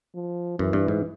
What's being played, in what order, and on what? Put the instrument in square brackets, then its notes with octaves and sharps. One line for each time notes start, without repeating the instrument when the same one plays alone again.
[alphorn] F3
[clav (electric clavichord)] F#2 [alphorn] E3
[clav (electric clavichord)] G2
G#2